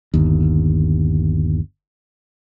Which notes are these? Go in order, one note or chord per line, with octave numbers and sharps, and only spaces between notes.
G1 D#2